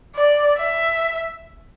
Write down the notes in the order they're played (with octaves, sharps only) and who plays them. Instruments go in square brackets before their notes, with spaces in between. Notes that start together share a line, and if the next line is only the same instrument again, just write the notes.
[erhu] D5
E5